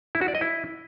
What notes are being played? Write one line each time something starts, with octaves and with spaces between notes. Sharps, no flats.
E4
F#4
D5
D#5
E4